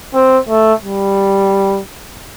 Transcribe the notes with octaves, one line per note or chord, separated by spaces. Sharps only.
C4
A3
G3